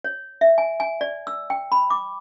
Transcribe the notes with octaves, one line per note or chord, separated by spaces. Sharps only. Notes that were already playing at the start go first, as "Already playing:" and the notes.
C#5
E5
G#5
G#5
D5
E6
G5
B5
D6